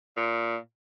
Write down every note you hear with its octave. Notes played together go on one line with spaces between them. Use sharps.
A#2